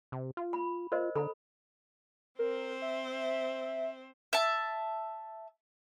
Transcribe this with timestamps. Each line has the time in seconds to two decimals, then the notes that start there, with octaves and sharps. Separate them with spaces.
0.12 C3
0.37 F4
0.53 B5
0.92 F4 A#4 C5 D#5
1.15 D3 A4 A#5 B5
2.39 C4 A#4 C5
2.82 E5
4.33 E5 A5